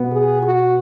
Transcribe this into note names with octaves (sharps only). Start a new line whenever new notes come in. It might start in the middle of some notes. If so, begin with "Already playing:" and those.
Already playing: B2 B3
G#4
F#4